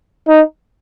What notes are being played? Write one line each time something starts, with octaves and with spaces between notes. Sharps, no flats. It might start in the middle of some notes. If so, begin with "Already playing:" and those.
D#4